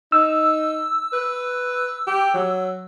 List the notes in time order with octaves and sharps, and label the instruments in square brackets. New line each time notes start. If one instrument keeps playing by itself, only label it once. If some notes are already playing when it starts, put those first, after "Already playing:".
[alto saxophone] D#4 [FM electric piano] E6
[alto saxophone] B4
G4
F#3